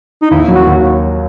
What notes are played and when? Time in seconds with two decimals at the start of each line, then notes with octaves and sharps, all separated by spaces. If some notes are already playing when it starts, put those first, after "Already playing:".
0.22 D#4
0.30 D#2 E4
0.48 F#3
0.55 F#4
0.67 D#2